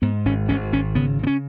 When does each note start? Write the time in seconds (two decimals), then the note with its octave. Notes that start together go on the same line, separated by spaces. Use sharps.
0.02 G#2 B3
0.25 G#1 C#4
0.49 G#1 C#4
0.72 G#1 C#4
0.95 C#3 B3
1.19 C#3 B3
1.27 C#4